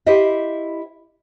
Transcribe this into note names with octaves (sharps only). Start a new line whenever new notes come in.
E4 G4 C5 D#5 E5